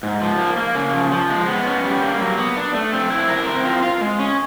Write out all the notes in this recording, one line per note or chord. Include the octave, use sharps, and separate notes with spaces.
G#2
F3
A#3
A#3
C#3
F3
F3
G#3
B3
C#4
G3
A#3
F#3
B3
D4
A3
C4
E4
A#4
C4
F4
F4
G#3
C#4